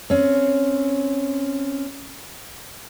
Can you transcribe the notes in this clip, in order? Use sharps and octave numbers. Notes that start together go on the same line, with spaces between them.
C4 C#4